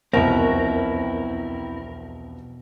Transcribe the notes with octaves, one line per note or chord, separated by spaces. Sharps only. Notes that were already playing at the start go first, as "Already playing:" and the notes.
E1 C2 F2 B2 C4 E4 A#4